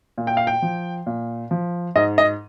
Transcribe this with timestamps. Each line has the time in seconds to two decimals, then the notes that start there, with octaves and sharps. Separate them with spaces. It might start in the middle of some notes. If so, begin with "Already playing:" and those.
0.18 A#2
0.27 G5
0.37 F5
0.47 G5
0.62 F3
1.07 A#2
1.51 F3
1.95 G#2 D#5
2.18 D#5